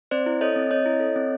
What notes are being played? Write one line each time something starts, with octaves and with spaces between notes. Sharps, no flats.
C4 C5 D5
E4
A4 C#5 D#5
C4
C4 C#5 D#5
E4
A4
C4